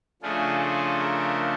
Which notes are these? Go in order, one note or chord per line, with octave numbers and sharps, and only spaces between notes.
C#3 F3 A3 D4 F4 G#4
G#4
A#4